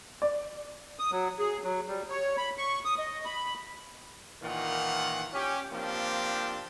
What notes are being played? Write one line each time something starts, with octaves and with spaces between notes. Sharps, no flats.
D5
D#6
F#3
G#4
F#3
G3
C#5
B5
C#6
D#6
D#5
B5
A#2 D#3 E3 F4 F#5
C#4 G4
F3 A#3 C4 D4 G4